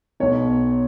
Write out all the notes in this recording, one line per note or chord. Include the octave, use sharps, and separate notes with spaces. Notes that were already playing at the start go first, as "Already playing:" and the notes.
B1 B2 C#5